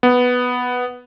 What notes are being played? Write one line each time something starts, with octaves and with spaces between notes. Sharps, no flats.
B3